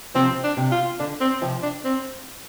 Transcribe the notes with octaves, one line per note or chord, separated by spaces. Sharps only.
C3 F3 C4
D4
C3
F4
D3 D4
C4
C3 F3
D4
C4